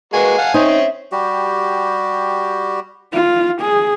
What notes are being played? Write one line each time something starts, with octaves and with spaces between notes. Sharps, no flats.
G#3 A#3 F#4 B4 G#5
F5 F#5 A5
C4 C#4 D#4 E5
G3 F#4 G4
F4
G#4